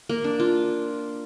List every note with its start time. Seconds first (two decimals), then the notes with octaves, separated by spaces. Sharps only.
0.09 A#3
0.24 D4
0.40 F4